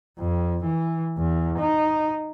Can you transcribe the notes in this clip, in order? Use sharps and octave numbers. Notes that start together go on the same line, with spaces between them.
F2
E3
E2
D#4